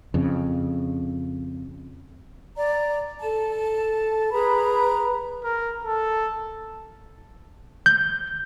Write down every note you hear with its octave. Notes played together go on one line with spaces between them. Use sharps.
F2 C#3
D5 A#5
A4 A5
G#4 B4 A#5 B5
A#4
A4
G6